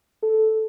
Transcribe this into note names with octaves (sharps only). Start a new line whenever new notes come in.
A4